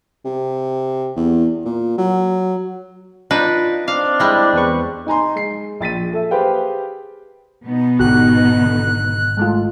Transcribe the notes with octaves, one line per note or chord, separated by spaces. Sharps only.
C3
E2
A#2
F#3
D4 D#4 F4 B4 D#5
C4 D4 F5
G3 G#3 E4 D#5
E2 B4 C#6
D#4 G#5 A#5 C6
G#3 C7
A#1 A6 B6 D#7
A4 E5
G4 G#4 B4 C5 F5 G5
B2 B3 D#4
G#1 D3 F#4 G4 F#6
D3
G#3 A3 F4